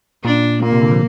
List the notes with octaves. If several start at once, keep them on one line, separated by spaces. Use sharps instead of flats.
A#2 D4
A#2 A#3
C3
D3
F3